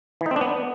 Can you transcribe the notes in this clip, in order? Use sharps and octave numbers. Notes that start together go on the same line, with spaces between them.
E3
D#4
C4
D4
B3